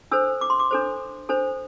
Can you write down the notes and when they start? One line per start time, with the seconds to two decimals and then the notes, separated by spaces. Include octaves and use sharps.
0.11 D4 A4 C5 E6
0.41 D6
0.50 C6
0.59 D6
0.71 D4 A4 C5
1.29 D4 A4 C5